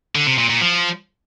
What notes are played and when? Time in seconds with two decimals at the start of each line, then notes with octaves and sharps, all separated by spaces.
0.15 D3
0.27 C3
0.38 A#2
0.50 A#2
0.61 F3